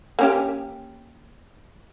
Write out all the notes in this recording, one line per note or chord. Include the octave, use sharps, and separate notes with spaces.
A#3 C#4 G4